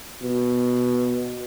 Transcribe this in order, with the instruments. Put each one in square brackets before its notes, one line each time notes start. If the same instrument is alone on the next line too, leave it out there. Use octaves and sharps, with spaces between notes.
[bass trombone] B2